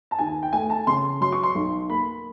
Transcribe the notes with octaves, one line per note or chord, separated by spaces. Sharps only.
A5
D#2 G#5
G5
A3 G#5
A5
C#3 C6
F#3 C6
C#6
C6
B1
A#3 B5